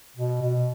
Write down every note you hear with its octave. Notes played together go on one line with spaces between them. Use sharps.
B2
B2